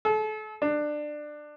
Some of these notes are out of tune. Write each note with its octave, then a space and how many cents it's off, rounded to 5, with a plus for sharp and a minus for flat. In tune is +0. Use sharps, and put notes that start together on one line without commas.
A4 -35
D4 +20